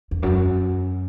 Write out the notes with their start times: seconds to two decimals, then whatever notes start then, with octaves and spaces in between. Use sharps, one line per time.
0.11 E2
0.23 F#2